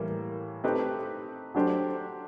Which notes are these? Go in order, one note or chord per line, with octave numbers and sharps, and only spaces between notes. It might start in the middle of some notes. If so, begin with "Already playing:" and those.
Already playing: A2 E3 G3 A#3
A3 C4 D#4 G4 B4
F#3 A3 D4 G4 C5